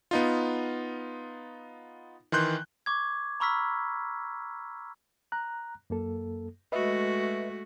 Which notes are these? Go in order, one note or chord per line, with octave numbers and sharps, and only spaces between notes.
B3 D#4 F4
D#3 E3 C6 F#6 G6
C#6 D6 G#6
A#5 B5 C#6 E6 F6 B6
A#5 F#6
F#2 A#3 A4
G#3 A3 F#4 B4 D#5 E5